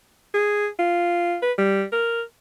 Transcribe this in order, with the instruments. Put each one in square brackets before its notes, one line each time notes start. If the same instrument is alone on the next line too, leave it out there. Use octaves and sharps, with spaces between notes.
[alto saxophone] G#4
F4
B4
G3
A#4